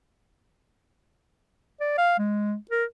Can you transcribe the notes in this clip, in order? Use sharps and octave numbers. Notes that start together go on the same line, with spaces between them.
D5
F5
G#3
A#4